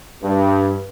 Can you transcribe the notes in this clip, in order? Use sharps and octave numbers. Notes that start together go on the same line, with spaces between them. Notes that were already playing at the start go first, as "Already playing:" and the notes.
G2